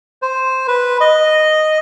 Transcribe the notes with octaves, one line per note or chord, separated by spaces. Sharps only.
C5
B4
D#5